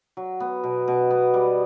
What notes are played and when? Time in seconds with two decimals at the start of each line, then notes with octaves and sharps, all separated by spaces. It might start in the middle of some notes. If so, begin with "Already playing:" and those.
0.17 F#3
0.40 B3
0.64 B2
0.88 B2
1.11 B3
1.34 G3